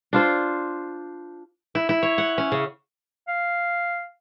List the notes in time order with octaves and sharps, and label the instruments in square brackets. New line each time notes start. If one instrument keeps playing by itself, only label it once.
[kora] D4 F4 C5
[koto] E4
E4
C#5
F#5
C#4
C#3
[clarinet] F5